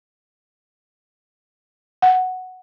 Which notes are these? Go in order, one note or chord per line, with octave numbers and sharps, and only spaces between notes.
F#5